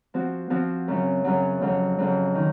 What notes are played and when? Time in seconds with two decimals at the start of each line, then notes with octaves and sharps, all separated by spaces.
0.14 F3 C4 F#4
0.50 F3 C4 F#4
0.88 F#2 C#3 F#3
1.24 F#2 C#3 F#3
1.61 F2 C#3 F#3
1.98 F2 C#3 F#3
2.35 D#3